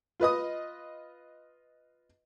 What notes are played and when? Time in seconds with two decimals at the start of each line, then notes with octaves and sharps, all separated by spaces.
0.20 F4 B4 D#5 D#6